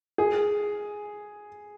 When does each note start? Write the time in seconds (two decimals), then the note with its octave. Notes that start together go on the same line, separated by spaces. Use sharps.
0.18 G#4